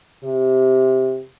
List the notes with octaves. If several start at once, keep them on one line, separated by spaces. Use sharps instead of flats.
C3